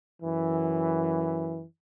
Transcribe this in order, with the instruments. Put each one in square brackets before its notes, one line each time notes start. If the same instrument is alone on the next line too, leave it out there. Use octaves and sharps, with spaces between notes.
[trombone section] F#2 E3